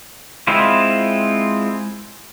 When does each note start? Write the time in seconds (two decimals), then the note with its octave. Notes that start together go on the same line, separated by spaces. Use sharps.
0.47 G#3 C4 E4 F4